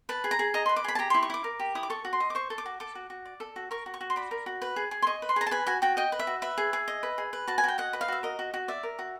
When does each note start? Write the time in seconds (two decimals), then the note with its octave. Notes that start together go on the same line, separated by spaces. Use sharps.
0.09 B4 A5
0.24 G#4
0.31 A#5
0.39 G#4
0.54 D#5 A#5
0.66 C6
0.69 B4
0.76 D6
0.84 G#4 B5
0.95 A5
0.99 G4 A#5
1.10 C6
1.14 E4
1.23 C#6
1.30 E4 D6
1.44 A#4
1.60 G4
1.75 E4 D#6
1.83 D6
1.90 A4 C#6
2.05 F#4
2.13 C6
2.20 D#5
2.30 D6
2.35 C5 C#6
2.50 A4
2.58 D6
2.66 F#4
2.80 A4 D6
2.95 F#4
3.10 F#4
3.26 D5
3.40 A4
3.56 F#4
3.71 A#4 C#6
3.86 F#4
3.94 C#6
4.01 F#4
4.10 C6
4.16 D5 B5
4.31 A#4
4.46 F#4
4.62 B4
4.76 G#4
4.91 G#4
5.02 C6
5.07 D#5 C#6
5.22 B4
5.29 C6
5.36 G#4 A#5
5.47 A5
5.51 B4 G#5
5.67 F#4 G#5
5.82 F#4 G5
5.97 D#5 G5
6.12 B4
6.19 E5
6.27 F#4
6.42 B4 E5
6.58 G#4
6.73 G#4
6.88 D#5
7.03 B4
7.18 G#4
7.33 B4
7.48 F#4 A5
7.58 G#5
7.64 F#4 G5
7.78 D#5 F#5
7.93 B4
8.01 F5
8.08 F#4 E5
8.23 A#4 D#5
8.39 F#4
8.54 F#4
8.68 D5 E5
8.83 A#4
8.99 F#4